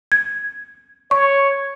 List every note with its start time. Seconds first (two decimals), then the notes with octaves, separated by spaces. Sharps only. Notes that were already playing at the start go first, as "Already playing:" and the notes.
0.12 G#6
1.11 C#5 C#6